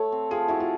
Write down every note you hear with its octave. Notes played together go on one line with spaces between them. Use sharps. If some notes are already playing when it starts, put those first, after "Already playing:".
Already playing: A3 A4 C#5
C4
F3 G#4
E4 F#4
F4